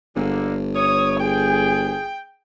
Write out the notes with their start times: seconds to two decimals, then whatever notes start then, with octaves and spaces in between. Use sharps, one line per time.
0.16 G1 D3 G#3 A#3
0.76 C#5 D#6
1.20 G#4 G5